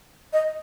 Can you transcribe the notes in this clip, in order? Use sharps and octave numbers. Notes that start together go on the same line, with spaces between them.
D#5